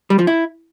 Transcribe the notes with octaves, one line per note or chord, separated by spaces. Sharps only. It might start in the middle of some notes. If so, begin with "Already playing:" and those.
G3
F3
E4